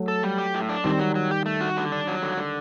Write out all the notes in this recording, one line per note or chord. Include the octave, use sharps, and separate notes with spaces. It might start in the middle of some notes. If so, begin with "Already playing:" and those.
Already playing: F#3 A3
A4
G3
G4
A2
D4
D#3 G3 C4
F#3
F#3
G4
A3
F#4
D3
D4
F#3
D3
D3